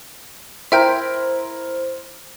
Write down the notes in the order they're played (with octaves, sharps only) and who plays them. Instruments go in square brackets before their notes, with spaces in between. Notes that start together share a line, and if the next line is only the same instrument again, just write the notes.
[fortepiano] E4 A#4 [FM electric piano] C5 [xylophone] E5 G5 G6